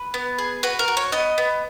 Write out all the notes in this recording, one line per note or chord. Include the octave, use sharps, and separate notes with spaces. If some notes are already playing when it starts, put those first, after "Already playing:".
Already playing: B4
B3
G#4
F#4 B4
A#4
F#4
C#5
B3 D#5
B3